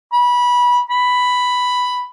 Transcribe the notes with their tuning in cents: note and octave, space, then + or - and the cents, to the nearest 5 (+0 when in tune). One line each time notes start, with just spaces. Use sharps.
B5 -20
B5 +5